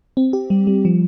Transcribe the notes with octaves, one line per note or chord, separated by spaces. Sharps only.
C4
G4
G3
G3
F3